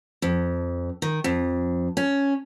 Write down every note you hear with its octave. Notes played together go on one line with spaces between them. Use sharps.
F2
D#3
F2
C#4